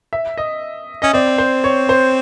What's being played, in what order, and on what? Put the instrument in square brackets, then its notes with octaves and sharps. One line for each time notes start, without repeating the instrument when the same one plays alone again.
[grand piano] E5
D#5
[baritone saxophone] C#4 [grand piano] D#5
[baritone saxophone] C4 [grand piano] D5
[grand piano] C5
C#5
C5